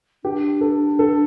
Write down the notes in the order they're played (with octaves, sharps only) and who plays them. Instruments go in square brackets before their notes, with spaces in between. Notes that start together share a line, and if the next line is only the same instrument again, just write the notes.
[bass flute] D4 [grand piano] G4
[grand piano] A4
A4